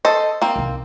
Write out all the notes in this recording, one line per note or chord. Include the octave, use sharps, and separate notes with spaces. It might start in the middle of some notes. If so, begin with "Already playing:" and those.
A4 C5 D#5
A#3 C4
C2 D#3